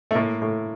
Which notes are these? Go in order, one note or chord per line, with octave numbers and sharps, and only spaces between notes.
A3
A2 A#3
A2